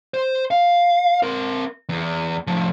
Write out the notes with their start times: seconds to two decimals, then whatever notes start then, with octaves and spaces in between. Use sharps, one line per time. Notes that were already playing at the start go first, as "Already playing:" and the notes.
0.14 C5
0.51 F5
1.23 C4 A#4
1.89 E2
2.47 A2 F3